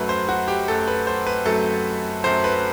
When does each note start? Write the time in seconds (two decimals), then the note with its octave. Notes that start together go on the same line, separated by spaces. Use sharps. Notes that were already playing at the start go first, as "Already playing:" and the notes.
Already playing: F#2 F#3 A3 B4
0.09 C5
0.29 F#4
0.48 G4
0.68 F#2 F#3 A3 A4
0.88 B4
1.07 C5
1.27 B4
1.45 F#2 F#3 A3 A4
2.24 F#2 F#3 A3 C5
2.44 B4